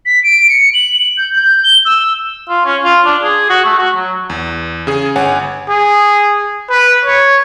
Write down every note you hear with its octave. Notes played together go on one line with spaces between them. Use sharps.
B6
D7
C#7
F#7
G6
G6
G7
E6
F4
C#4
F4
D4
G#4
F#4
A3
F#4
F#3
E2
C#3 G#4
G1 C#5 F#5 G#5
G#4
B4
C#5